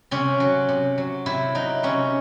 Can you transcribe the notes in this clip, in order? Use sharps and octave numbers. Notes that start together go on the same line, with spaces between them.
C3 C#4
F#3
C3
F#3
C3 E4
F#3 D#4
C3 C#4